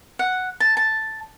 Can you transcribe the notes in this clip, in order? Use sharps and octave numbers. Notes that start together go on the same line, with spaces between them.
F#5
A5
A5